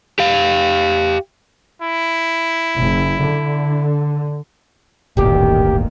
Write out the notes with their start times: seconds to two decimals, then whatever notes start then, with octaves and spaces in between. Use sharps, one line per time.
0.19 G4 F5
1.82 E4
2.77 F#1
3.21 D3
5.17 D1 G1 D2 A#2 D#3 A#3 G4